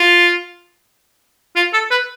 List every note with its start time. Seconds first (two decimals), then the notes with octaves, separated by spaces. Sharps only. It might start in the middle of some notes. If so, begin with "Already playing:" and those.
Already playing: F4
1.56 F4
1.73 A4
1.91 B4